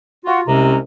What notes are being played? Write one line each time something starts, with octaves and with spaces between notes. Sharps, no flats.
F4 F#4
C2 C3 G#3 C4 C#4 A#5